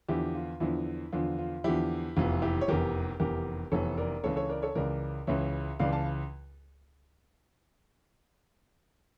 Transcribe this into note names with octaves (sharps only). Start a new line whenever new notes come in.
E2 D3 F3 E4 G4
F4
E2 D3 F3 E4
E2 D3 F3 F4
F4
E2 D3 F3 E4 G4
F1 E2 E3 F4
E4 G4
C#5
F1 E2 E3 G4 A#4
F1 E2 E3 G4 A#4
F1 E2 E3 A4 C#5
A#4 D5
C#2 C#3 E3 A4 C#5
A4 C#5
A#4 D5
A4 C#5
C#2 C#3 E3 A#4 D5
C#2 C#3 E3 C#5 E5
C#2 C#3 E3 D5 F5
F5 A5